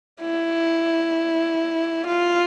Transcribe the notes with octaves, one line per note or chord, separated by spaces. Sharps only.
E4
F4